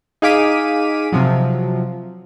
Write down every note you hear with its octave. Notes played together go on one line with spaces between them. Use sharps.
D#4 G#4 F5 D6 B6 D#7
C3 F3 F#3